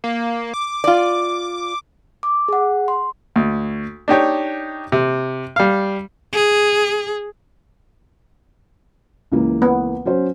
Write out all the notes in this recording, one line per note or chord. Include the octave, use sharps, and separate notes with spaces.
A#3
D6
F4 D5
D6
G#4 F#5
C6
D2
D4 D#4 G4 C#5
C3
G3 F5
G#4
C#2 E3 A#3
B3
F#3 C#4 C5